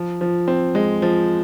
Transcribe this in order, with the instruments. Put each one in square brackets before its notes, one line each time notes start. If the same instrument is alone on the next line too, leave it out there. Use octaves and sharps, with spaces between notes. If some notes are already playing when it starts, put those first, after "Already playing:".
Already playing: [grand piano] F3
F3
C4
G#3
F3